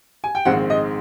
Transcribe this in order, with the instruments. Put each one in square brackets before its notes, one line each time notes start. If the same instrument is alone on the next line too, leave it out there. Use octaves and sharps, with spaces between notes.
[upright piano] G#5
G5
A#1 G#2 D#3 G#3 C4 F#5
D#5